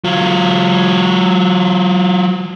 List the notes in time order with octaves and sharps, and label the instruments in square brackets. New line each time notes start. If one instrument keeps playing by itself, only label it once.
[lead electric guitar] F#3 F4